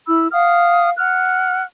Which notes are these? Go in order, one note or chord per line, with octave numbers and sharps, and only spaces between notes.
E4 B5 E6
F5 F#5 D#6 F6
F#5 F6 F#6